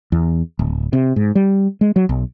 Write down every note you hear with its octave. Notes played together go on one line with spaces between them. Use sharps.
E2
D1
C3
G#2
G3
G#3
F#3
B1